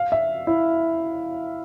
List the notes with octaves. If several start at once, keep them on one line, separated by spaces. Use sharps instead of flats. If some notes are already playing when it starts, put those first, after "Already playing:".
Already playing: F5
E5
E4